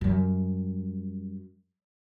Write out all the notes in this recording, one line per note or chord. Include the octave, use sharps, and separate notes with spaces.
F#2 G3